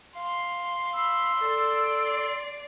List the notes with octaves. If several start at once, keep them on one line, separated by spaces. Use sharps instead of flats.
F5 C6
B5 E6
A4 D5 C7